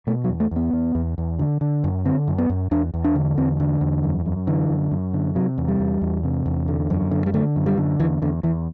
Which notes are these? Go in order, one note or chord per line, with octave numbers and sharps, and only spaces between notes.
B2 A3
F#3
E2
A3
E2 B3
E2
E2
E2
D3
D3
F#2
D3 C4
F#2
B3
F#2
E2 D4
E2
D4
D3
E2 C4
D3
E2
F#2
F#2
D3 E3
F#2
F#2
D3
C3 F#3
E2
G3
E2
E2
C3
E2
D3
F#2
D3
G3
D3 A3
F#2
G3
D3
E2 E3
E2 D3
E2 E3